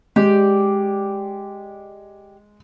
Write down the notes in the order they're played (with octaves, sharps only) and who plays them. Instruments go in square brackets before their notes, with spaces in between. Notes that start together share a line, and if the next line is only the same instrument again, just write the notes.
[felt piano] G#3 [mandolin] G4 D5